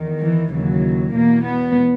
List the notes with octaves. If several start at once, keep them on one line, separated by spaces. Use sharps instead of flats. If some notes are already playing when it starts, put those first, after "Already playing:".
Already playing: E2 D#3
E3
D#2 C#3 E3 F#3
E2 B2 A#3
B3